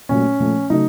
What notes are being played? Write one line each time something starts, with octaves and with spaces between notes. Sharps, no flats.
A#2 F#3 A3 C#4
A#2 F3 A3
C#3 F#3 A3 D#4